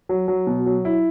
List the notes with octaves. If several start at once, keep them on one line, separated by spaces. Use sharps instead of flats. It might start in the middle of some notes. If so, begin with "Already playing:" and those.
F#3
F#3
B2
F#3
E4